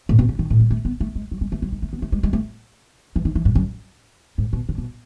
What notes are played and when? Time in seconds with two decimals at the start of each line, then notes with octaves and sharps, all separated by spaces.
0.09 A2
0.19 B2
0.29 C#3
0.39 D#3
0.50 A2
0.60 G#3
0.71 A3
0.85 B3
1.00 A3
1.15 G#3
1.31 F#3
1.41 G#3
1.52 A3
1.62 F#3
1.72 G#3
1.82 A3
1.93 B3
2.02 A3
2.12 G#3
2.23 G#3
2.33 A3
3.16 E3
3.25 D#3
3.35 E3
3.45 G#2
3.55 F#2
4.38 G#2
4.53 B2
4.69 C#3
4.78 B2